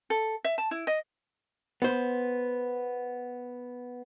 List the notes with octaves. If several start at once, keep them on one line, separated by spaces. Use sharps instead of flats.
A4
E5
A5
E4
D#5
B3 C5